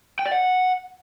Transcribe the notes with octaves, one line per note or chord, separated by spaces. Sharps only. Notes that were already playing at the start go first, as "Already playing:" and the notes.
G5
D5
F#5